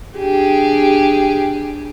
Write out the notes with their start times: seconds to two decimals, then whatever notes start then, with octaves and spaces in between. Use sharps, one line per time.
0.18 D4 G4 G#4